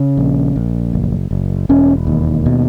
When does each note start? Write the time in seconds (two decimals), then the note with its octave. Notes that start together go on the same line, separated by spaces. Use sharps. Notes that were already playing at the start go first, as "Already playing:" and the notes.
Already playing: C#3
0.17 A#1
0.56 A#1
0.93 F#1
1.31 F#1
1.69 E1 C#4
2.07 D#2
2.46 B2